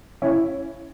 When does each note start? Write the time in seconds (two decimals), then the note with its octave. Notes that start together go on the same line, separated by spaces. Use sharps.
0.22 C#4 E4